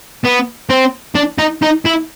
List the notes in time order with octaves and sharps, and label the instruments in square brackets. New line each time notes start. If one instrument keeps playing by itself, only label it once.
[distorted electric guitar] B3
C4
D4
D#4
D#4
E4